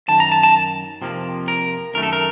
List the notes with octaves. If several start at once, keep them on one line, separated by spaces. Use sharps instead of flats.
F#2 D#3 A5
A#5
A5
A5
F2 C3 F3 A#3
A#4
F#2 D#3 A3 A#4
A4
A#4